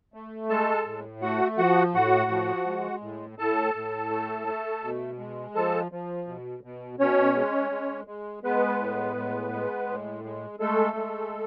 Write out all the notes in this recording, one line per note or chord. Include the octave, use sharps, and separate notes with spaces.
A3
G#3 A4 A5
A2
A3 F#4 F#5
F3 F#4 F#5
A2 F#4 F#5
F3
G#3
A2
A2 A4 A5
A2
A3
A3
B2
G#3
F3 A4 A5
F3
B2
B2
B2 C#4 C#5
G#3
G#3
G#3
G#3 B3 B4
A2
G#3
G#3
A2
G#3
G#3 A3 A4
G#3